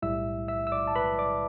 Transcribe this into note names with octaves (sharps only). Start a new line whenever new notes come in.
B1 A2 G3 E4 E5 E6
E5 E6
E6
D5 D6
A5
B4 B5
D5 D6